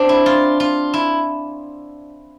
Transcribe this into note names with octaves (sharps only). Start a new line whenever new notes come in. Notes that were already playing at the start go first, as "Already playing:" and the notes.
Already playing: C4 D4
E4
F4
F4
E4